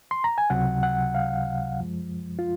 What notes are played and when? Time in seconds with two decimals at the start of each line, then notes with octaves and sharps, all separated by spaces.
0.11 C6
0.24 A#5
0.38 G#5
0.50 C#2 C3 F#3 F#5
0.83 F#5
1.15 F5
1.79 F#2 F3 G#3
2.39 F4